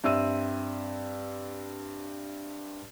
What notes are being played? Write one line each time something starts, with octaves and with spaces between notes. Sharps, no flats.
G2 C4 E5 E6 D#7